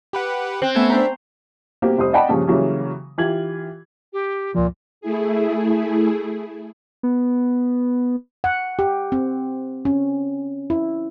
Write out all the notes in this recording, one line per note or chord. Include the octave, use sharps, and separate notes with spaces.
G4 B4 F#5
C4 F#6
A3 B3 C#4 E6 G#6
D4 C5 E5 A#5
B2 G3 A#3 C4 G4
F1 G3 C5 D#6
D5 D#5 F#5 G5 A5 B5
G2 A#2 C#3 F3 G3 C#4
C#3 E3 F#3 G3 A#3 C#4
E3 F4 G4 G#6 F#7
G4
C#2 A#2 F3
A3 E4 G#4
B3
F#5
G4
C4
C#4
E4